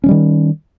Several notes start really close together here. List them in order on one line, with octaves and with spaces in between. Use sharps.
C#4 F#3 G3 D#3